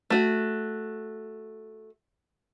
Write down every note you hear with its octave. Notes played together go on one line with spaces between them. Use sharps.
A3 F#4